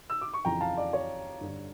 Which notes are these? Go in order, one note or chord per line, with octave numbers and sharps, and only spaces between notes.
E6
D6
C#6
F2 C#3 E3 G5 A#5
F5 A5
D5
C#5
G2 D3